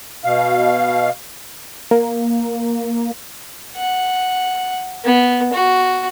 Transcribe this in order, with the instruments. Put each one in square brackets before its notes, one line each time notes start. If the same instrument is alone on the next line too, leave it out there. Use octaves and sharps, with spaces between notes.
[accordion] B2 F5
[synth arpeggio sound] A#3
[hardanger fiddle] F#5
B3
F#4